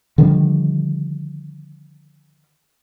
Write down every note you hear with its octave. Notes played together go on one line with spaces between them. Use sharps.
D3 D#3 F3 G3